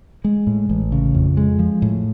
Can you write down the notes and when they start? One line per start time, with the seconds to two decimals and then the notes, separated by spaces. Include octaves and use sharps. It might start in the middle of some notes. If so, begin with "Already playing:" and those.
0.24 G#3
0.47 A2
0.69 A1
0.92 C#3
1.14 F2
1.37 G#3
1.59 F3
1.82 A2